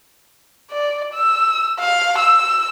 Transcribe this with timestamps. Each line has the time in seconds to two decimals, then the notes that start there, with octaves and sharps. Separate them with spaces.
0.71 D5
1.14 E6
1.79 F5
2.18 E6